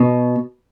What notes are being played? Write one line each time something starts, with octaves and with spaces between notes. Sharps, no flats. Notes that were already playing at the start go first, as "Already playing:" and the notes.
Already playing: B2